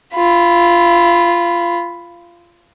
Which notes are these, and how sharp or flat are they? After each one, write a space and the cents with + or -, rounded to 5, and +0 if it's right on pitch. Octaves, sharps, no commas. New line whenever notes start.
F4 -15 B5 +0